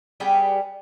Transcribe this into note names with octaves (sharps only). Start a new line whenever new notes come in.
G3 B3 G4 G#4